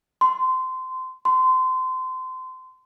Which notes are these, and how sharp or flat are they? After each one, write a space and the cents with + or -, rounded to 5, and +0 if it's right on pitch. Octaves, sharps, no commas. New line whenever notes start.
C6 -20
C6 -25